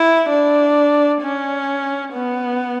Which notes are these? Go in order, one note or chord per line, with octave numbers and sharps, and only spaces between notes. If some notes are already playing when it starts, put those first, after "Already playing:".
Already playing: E4
D4
C#4
B3